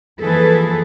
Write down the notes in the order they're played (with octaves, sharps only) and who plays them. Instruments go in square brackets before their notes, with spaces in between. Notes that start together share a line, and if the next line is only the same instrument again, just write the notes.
[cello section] E3 F3 A#3 G#4 A4 B4